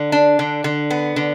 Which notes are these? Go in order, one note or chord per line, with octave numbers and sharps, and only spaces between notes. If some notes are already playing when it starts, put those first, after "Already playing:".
Already playing: D3
D4
D3
D3
B3
D3